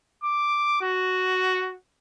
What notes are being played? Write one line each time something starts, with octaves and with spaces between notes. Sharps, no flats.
D6
F#4